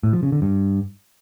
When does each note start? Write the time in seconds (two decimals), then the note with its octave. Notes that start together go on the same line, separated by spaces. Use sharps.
0.03 A2
0.13 F3
0.23 C#3
0.32 D3
0.42 G2